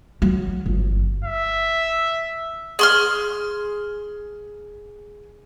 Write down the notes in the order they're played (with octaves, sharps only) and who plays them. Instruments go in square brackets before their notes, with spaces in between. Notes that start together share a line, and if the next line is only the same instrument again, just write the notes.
[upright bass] F#3
G1
[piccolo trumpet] E5
[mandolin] G#4 C6 F6